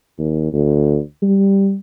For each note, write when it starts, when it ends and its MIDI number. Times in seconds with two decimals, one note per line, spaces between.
0.18 0.50 39
0.53 0.99 38
1.22 1.75 55